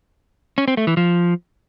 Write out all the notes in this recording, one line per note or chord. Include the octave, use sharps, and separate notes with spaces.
C#4
C4
A3
E3
F3